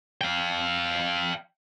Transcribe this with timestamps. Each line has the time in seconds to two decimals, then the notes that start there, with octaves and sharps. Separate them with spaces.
0.21 F5 G5